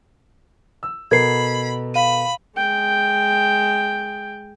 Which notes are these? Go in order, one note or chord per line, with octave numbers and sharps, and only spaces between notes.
E6
B2 A4 A#4 B5 G#6 C7
F5 B5 D#7
G#3 G5